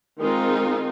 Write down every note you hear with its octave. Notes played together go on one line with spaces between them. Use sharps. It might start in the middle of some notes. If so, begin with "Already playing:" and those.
D#3 G#3 C4 D#4 F4